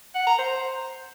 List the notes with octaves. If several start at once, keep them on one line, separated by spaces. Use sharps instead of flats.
F#5
A#5
C5